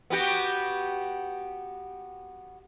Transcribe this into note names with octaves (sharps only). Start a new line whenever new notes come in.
B3 F#4 G4